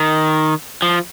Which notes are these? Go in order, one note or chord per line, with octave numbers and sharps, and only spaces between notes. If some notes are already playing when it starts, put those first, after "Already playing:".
Already playing: D#3
F3